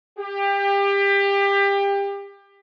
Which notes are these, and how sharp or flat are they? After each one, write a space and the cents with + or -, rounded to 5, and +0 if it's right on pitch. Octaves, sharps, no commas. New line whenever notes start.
G4 +25